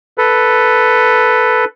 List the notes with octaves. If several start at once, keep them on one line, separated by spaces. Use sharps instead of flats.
A4 B4